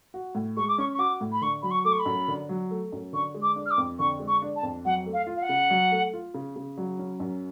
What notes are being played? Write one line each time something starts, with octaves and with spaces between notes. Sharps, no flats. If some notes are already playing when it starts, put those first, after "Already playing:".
F#4
A2
G#3 C#6
D6
C#4 C#6
C#6
F#4 D6
A2
B5
D3 C#6
F#3 B5
C#6
A3 D6
C#6
B5
F#2
D3
F#3
A3
F#2
D3 C#6
G#3
D6
D4
F6
D6
F2
D3 C#6
G#3
C#6
D4
A5
F2
F#3 F#5
A3
F5
F4
F5
F#5
C#3
F#3
A3
F4
C#3
C#3
F#3
C#4
F#2